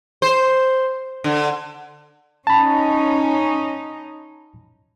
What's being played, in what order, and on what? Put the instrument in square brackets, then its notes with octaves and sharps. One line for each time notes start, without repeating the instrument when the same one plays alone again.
[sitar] C5
D3
[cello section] C#4 D#4 [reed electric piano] A5 B5